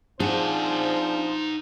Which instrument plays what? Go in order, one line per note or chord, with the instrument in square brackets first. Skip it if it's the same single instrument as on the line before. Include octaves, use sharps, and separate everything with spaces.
[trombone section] F3 C4 C5 [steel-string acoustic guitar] D4 G#4 [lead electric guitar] D#4 F#5